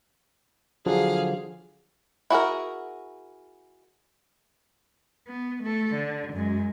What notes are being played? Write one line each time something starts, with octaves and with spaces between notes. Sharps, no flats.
D3 F3 F#3 G#4 F5
E4 F#4 G#4 A#4
B3
A3 A4
D3
F#2 G#3